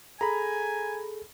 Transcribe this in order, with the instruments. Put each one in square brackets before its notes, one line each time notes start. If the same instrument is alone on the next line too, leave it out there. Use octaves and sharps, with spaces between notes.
[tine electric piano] G#4 A4 [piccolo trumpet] G#5 [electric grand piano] A#5 B5